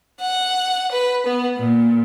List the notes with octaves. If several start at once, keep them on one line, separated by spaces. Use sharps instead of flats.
F#5
B4
B3
A#2